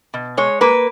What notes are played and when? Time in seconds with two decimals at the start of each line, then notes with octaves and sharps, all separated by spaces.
0.14 B2
0.37 G#3 C#5
0.61 A#3 B4